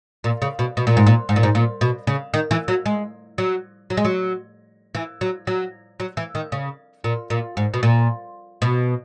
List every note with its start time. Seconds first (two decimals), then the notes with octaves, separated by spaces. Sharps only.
0.24 A#2
0.42 C#3
0.59 B2
0.77 B2
0.87 A#2
0.97 G#2
1.07 A#2
1.29 G#2
1.36 A#2
1.43 G#2
1.55 A#2
1.81 B2
2.07 C#3
2.34 D#3
2.51 E3
2.68 F#3
2.86 G#3
3.38 F#3
3.90 F#3
3.97 G#3
4.05 F#3
4.95 E3
5.21 F#3
5.47 F#3
6.00 F#3
6.17 E3
6.35 D#3
6.52 C#3
7.04 A#2
7.30 A#2
7.57 G#2
7.74 B2
7.83 A#2
8.62 B2